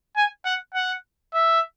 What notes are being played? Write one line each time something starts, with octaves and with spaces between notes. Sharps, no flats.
G#5
F#5
F#5
E5